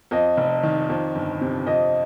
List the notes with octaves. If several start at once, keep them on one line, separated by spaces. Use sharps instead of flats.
F2 D#5
F1
D#3
F2
G1
C3
F2 D#5